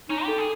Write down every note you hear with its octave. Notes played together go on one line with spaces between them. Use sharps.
C#4 D#4
G4 A4
G#4